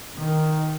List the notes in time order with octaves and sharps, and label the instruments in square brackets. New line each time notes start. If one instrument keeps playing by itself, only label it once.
[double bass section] D#3